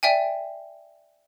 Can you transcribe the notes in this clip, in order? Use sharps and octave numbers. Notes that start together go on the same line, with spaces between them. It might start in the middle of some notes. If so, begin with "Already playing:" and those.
D5 E5 G5 G#5